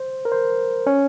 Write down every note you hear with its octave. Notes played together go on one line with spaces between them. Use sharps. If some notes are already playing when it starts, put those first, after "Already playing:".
Already playing: C5
A#4
C5
C#4 C#5